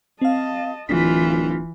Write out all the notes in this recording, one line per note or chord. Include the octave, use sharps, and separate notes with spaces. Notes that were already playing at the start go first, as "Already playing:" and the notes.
C4 D#5 F5 A5
D1 E3 F4 B6